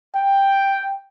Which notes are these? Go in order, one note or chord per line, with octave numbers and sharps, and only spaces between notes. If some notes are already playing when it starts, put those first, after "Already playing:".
G5